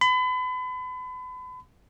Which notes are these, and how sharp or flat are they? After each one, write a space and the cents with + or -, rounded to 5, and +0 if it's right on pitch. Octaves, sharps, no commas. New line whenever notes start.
B5 +35